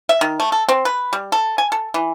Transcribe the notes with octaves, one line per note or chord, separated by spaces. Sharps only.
E5
D#3
A3
A4
C4
B4
G3
A4
G#5
A4
E3